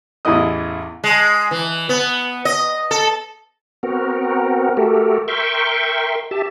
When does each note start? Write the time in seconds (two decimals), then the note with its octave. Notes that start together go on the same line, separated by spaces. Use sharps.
0.25 A1 E2 E3 E4 D#5 D#6
1.04 G#3
1.51 E3
1.89 B3
2.45 D#5
2.91 A4
3.83 B3 C4 F#4 A#4
4.77 A3 F#4 G4 A4 A#4
5.28 A#4 E5 G5 C6 C#6
6.31 G4 E5 A5